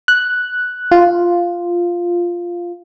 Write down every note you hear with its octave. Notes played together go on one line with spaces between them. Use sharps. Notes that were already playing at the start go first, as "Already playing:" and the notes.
F#6
F4